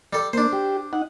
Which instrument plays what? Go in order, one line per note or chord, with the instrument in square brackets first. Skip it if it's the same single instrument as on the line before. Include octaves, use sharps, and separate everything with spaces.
[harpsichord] G3 A4
[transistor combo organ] A#3 [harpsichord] D4 C5
[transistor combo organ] G4
D#4 F#5